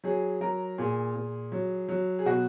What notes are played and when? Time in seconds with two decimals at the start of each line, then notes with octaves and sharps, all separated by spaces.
0.04 F#3 G#4
0.41 F#3 A#4
0.78 A#2 G#4
1.15 A#2
1.52 F#3
1.89 F#3
2.19 G#4
2.26 B2 F#4